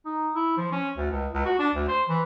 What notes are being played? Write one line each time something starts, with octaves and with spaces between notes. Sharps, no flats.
D#4
E4
F3
C#4
D2
C#2
C#2
F#4
D4
D2
C5
E3